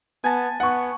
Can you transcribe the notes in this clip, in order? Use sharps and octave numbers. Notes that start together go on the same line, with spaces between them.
B3 G#5 A5
B3 F#5 C#6